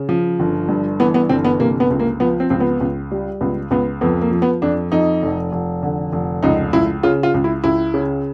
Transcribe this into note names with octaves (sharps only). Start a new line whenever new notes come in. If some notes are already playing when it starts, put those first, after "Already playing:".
Already playing: C#3
F3
G1
G2
E3 B3
B3
G1 C4
B3
C3 A#3
B3
C#2
A#3
F3 B3
C4
C#2 C4
B3
C#2
G3
C#2 B3
C#2 B3
F2 B3
A#3
F3
B3
F2 D4
F2 D#4
F1
F1
D3
F1
C#2 D#4
C#2 E4
C#3 F4
F4
C#2
E4
C#2 E4
C#3